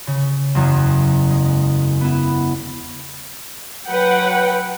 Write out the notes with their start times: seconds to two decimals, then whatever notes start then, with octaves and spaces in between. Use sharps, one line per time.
0.07 C#3
0.55 F#1 E2
1.30 G#3
2.01 B3 E4
3.87 F#3 B4 F#5 G5